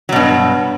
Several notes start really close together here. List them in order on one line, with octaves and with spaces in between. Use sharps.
F#3 B2 G2